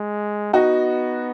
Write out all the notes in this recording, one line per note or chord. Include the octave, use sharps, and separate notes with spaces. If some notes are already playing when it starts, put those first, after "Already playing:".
Already playing: G#3
B3 D#4 F#4